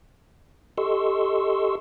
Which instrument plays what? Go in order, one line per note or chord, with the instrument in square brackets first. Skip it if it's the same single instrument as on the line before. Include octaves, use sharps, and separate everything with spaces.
[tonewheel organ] G4 A4 D#5 C6 C#6 E6